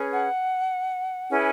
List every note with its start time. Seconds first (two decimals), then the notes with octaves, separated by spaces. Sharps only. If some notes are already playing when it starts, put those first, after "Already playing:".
Already playing: C#4 G#4 B4
0.13 F#5
1.30 C#4 E4 G#4 B4 G#5